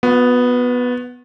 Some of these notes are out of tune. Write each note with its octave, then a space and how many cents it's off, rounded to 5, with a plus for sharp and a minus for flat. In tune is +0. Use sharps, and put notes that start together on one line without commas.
B3 +0 F#4 -45